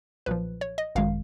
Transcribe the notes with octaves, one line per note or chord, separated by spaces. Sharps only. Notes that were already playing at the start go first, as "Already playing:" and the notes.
B1 A#2 F3 B4
C#5
D#5
G#1 F#2 D#3 G#3 F5